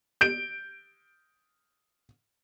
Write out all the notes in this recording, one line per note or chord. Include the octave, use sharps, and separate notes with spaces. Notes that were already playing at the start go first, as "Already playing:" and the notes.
G6 D7